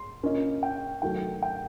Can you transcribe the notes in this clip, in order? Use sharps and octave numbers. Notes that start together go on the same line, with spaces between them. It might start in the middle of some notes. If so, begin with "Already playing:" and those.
Already playing: C6
A#3 C#4 F4 A#4 D#5
G5
D#3 F#3 A3 G5
G5